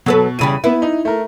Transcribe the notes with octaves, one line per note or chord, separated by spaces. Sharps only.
B2 F#3 A4 B4
E2 C#3 G3 B5 D#7
B3 E4 B4
D#4
A3 A#4